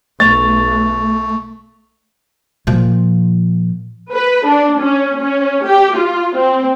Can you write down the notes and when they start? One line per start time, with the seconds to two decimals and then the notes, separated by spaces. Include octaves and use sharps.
0.20 B1 A3 C#6 A6 F7
2.67 A#2 F3
4.12 B4
4.47 D4
4.81 C#4
5.20 C#4
5.66 G4
5.96 F4
6.36 C4